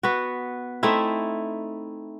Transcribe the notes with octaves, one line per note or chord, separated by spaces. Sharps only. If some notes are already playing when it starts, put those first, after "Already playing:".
B3 F#4
A3 C4 D#4 E4